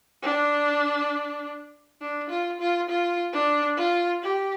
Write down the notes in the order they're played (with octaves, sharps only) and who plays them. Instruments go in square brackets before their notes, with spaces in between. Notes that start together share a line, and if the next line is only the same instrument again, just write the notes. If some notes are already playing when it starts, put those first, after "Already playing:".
[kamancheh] D4
D4
F4
F4
F4
D4
F4
G4